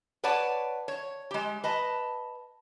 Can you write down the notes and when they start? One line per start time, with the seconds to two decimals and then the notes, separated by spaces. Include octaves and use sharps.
0.24 B4 C#5 D5 F#5 A5
0.88 C#5
1.31 G#3 G4
1.64 B4 D#5 A5